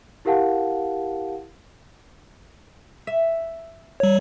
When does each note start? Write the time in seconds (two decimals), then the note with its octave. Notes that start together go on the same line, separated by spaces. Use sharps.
0.25 E4 G4 A#4 F5 F#5 A5
3.07 E5
4.00 G3 C#5